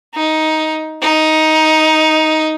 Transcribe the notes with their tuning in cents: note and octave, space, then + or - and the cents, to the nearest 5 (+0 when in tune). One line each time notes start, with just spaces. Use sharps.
D#4 +10
D#4 +10